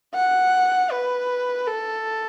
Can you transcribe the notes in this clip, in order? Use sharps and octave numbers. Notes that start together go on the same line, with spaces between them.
F#5
B4
A4